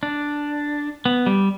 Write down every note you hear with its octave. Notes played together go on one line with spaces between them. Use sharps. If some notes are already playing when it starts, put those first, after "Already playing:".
D4
B3
G3